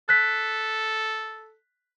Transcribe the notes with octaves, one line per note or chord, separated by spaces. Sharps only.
A4 F#6 B6